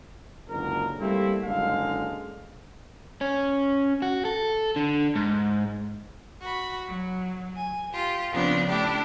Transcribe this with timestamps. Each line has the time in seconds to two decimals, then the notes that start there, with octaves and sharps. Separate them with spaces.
0.49 F#1 C#2 D3 A#4
0.99 G3 A3 A#3 C4 E4
1.45 F#1 D3 G#3 F5
3.21 C#4
4.02 F#4
4.25 A4
4.76 D3
5.15 G#2
6.41 F#4 B5
6.88 F#3
7.56 G#5
7.92 F4 G4
8.31 C#3 F3 B3 C4 D4
8.67 A3 D4 E4 G4